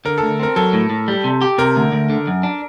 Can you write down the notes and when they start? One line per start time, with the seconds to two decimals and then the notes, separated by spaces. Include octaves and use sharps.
0.05 D3 A#4
0.18 D2 A4
0.40 C4 A#4
0.56 F#3 A4
0.73 A2
0.90 A2
1.08 G3
1.24 C3
1.42 G4
1.58 C3 A#4
1.76 D2
1.92 D2
2.10 D3
2.27 F#2
2.43 D4